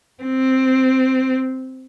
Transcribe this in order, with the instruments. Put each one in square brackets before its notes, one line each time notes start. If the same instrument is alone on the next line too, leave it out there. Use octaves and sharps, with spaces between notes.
[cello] C4